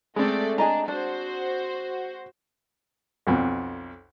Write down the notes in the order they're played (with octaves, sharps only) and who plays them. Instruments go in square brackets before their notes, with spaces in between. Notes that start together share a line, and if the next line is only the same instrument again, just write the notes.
[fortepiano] G#3 C4 [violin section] A3 D5
[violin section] D4 [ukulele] G#4 D#5 A#5
[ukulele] D4 [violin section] F#4 C5
[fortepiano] B1 F2